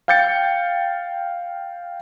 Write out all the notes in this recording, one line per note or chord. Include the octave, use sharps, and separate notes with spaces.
F5 G5 G6 A6 C#7